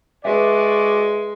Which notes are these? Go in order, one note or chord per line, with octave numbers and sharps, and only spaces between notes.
G#3 F#4 B4 D5 E5